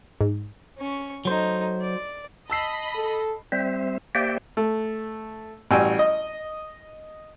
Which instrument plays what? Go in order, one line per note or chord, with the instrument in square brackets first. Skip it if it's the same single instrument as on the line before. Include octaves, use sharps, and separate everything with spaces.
[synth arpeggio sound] G#2
[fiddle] C#4 C#6
[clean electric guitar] F#3 C5 [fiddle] A3 D#4
[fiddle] D5
[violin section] D#5 B5 [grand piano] A5 E6 C7
[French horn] A4
[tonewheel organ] G3 C4 C5 E5
A#3 G4 C5 D5 E5 G5
[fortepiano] A3
A1 G3 F#4 G5 G#5 E6
D#5